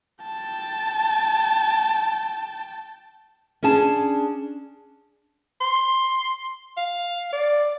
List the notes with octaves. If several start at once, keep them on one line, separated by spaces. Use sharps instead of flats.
G5 A5
C#4 D4 G#4 A5
C6
F5
D5